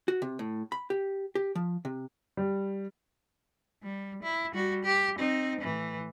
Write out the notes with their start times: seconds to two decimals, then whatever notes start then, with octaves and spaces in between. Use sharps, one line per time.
0.08 F#4
0.22 C3
0.39 A2
0.72 B5
0.90 G4
1.35 G4
1.55 F3
1.85 C3
2.37 G3
3.83 G3
4.23 E4
4.54 G3 F#4
4.85 G4
5.18 C4 D#4
5.61 A2 E3